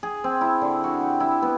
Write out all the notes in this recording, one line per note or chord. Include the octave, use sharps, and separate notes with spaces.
G#4
C4
E4
D3
F#4
G4
E4
B3